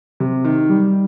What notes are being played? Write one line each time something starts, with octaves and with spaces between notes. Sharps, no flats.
C3
D#3
G3